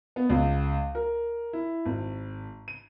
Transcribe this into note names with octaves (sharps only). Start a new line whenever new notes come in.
B3
C#2
A#4
E4
G#1
D#7